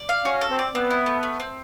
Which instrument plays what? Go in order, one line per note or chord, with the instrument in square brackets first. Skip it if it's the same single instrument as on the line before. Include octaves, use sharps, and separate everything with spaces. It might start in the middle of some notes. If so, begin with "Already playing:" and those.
Already playing: [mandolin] D5
F5
[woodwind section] C#4 [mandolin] F#4
[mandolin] A4
[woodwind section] C4
[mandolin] D5
[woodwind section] B3 [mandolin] C4
[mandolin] E4
A3
A3
C4